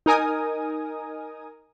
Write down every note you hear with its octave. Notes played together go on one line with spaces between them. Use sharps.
D#4 A#4 G#5 D#6